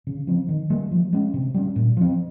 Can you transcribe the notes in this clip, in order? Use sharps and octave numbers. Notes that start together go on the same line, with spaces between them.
C#3
F3 C4
D#3
G3 A#3
F3
G#3 C#4
C3
G3 C#4
A#2
F3 C4